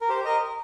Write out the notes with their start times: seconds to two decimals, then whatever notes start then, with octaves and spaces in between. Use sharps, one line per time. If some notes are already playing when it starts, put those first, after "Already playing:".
0.01 A#4
0.09 G4 C5
0.25 A#4 D#5